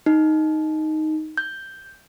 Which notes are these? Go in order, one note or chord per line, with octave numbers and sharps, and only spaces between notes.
D#4
G6